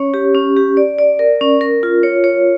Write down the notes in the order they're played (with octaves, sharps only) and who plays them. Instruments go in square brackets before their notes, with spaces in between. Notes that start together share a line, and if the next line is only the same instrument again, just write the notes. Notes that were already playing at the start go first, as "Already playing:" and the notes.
Already playing: [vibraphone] C#4 C#5
G4
C#4
G4
D5
D5
A#4
C#4
A#4
F4
C#5
C#5